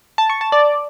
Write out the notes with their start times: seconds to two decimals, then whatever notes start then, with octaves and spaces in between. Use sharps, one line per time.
0.18 A5
0.30 C#6
0.41 A5
0.52 D5